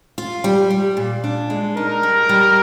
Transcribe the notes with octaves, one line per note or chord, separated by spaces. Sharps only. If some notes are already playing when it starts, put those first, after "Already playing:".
F4
G3
G3
A#2
D4
G#3
D#4 A#4
G3
G3